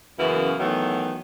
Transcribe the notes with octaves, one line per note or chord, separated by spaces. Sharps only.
F#2 C#3 E3 A#3 B3 F#4
D#3 E3 F#3 A3 B3